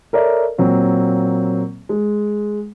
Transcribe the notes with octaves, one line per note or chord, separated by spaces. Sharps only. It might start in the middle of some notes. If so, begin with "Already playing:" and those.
A4 A#4 C#5 D5 E5
A#2 F#3 A#3 C4
G#3